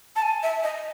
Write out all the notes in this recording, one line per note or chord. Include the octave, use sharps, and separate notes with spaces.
A5
G#5
E5
D#5